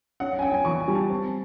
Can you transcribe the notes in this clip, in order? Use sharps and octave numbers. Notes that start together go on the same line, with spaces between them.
C#4 F#5
F#5
G#5
C#4 G5
G#5
E3 C#6
G#5
G3
A5
C4